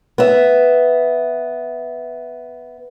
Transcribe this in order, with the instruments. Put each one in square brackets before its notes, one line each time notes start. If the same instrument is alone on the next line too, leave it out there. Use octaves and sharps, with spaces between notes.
[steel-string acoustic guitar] B3 E5